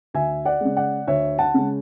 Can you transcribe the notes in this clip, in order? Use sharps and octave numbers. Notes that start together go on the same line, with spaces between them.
D2 E5 G#5
D5 F#5
C#3 G#3
D5 F#5
D2 C#5 E5
F#5 A5
C#3 G#3